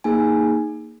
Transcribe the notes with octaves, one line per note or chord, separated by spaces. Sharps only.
A#3 D#4 G#4 G#5